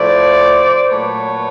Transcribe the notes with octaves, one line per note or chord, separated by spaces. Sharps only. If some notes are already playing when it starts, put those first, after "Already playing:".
Already playing: A2 F3 A3 C5 D5
A#2 F#3 A3 B4 C#5